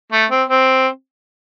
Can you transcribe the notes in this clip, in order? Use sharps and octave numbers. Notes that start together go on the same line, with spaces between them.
A3
C4
C4